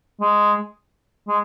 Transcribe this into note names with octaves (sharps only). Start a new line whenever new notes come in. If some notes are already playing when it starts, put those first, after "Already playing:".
G#3
G#3